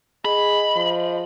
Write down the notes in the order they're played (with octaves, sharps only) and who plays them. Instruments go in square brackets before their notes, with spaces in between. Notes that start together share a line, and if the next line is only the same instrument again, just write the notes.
[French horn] G#4 [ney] D#5 [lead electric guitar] B5
[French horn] F3